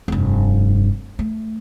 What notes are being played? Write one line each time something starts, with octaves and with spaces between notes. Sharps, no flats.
F1 G2
A3